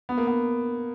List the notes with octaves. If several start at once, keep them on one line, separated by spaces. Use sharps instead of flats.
B3
A#3
B3